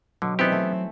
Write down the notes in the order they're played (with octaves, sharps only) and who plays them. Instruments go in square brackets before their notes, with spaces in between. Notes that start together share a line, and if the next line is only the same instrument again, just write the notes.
[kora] B2 [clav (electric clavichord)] D3 [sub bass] F#3
[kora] D#3 E3 E5 [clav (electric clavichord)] B3 G4 [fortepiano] C4
[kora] A3